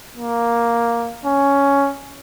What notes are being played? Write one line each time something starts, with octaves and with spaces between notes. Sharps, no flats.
A#3
C#4